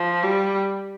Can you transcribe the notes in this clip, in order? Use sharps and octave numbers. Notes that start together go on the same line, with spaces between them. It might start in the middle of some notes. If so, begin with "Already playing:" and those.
Already playing: F3
G3